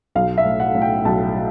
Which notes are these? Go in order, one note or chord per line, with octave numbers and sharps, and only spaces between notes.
B1 F5
E5
A2
F#5
A2
G5
B1 A5
F#3